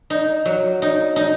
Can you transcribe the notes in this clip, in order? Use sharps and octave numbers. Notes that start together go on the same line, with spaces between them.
D#4
F#3
D#4
D#4